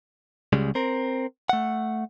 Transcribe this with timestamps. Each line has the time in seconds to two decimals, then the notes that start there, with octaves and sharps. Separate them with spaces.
0.53 C#2 C#3 G3 G#3
0.75 C4 A#4
1.49 A3 F#5